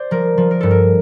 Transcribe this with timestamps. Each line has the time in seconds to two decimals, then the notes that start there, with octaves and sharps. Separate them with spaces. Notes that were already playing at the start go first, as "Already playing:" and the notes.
Already playing: C5 D5
0.11 F3 A#4
0.38 F3
0.51 A#4
0.61 G2 A4
0.71 A#4